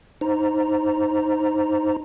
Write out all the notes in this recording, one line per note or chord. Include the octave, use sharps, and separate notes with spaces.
D#4 C5 A#5